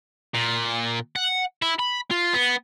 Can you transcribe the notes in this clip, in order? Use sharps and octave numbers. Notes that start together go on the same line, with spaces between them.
A#2
F#5
E4
B5
F4
B3